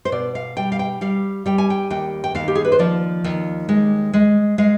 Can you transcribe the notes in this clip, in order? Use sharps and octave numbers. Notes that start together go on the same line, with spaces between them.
C5
B2 D5
F5
G3 G5
F5
G5
G3 F5
G3 G5
G#5
G5
D#2 G5
G5
D#2 F5
G4
G#4
B4
C5
F3 D5
D#2
G#3
G#3
G#3 F5